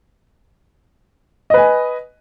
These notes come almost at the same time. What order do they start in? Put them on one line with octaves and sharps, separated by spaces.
D#5 B4 G#5